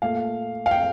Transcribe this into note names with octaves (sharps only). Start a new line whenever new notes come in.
A#2 A3 F5
F5
G5